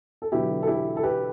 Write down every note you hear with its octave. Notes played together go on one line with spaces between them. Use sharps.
A4
E1 E2 D3 F#3 B3 E4 G4
A4
E4 G4
A4
G4 B4